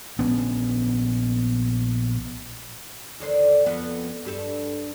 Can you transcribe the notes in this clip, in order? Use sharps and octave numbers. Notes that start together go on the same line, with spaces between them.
A#1 B3 C#4 D4
D#2 D3 C5
F2 B3
G2 G4 A4